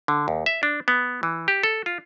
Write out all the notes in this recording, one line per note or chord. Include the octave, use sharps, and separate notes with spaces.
D3
D#2
E5
D4
B3
E3
G4
A4
F4